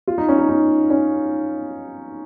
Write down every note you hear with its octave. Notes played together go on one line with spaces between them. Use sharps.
F4
D#4
C#4
D#4
D#4
C#4